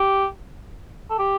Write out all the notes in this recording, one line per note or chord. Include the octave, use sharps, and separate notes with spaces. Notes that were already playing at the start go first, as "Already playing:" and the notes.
Already playing: G4
A4
G4